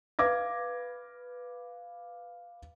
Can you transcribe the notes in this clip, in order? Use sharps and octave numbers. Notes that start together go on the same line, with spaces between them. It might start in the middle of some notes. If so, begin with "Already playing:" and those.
B4 F5 D6 G#6 A#6